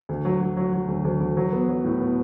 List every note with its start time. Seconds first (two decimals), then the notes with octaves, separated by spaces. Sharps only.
0.09 D2
0.25 F#3
0.41 F#3
0.57 F#3
0.73 F#3
0.88 D2
1.04 D2
1.21 D2
1.37 F#3
1.52 B3
1.68 F#3
1.84 A2
2.01 B3